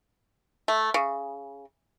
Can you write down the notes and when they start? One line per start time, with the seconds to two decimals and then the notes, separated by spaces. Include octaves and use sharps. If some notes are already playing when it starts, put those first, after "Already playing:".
0.68 A3
0.94 C#3